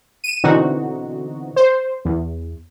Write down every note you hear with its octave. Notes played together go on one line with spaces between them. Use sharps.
D#7 E7
B2 D3 E3 C4 D#4 F#4
C5
E2